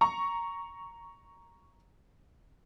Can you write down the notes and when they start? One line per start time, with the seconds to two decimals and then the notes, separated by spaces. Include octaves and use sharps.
0.01 A#5 C#6